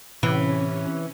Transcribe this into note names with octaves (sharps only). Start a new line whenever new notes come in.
A2 C3 E3 C#4